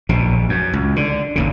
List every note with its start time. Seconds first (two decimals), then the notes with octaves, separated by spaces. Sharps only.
0.09 A#1 B2
0.49 F#2
0.73 C#2
0.96 D3
1.36 G1 D#2 C#3